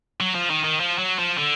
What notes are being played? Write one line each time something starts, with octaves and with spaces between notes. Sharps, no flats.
F#3
F3
D#3
D#3
F3
F#3
F3
D3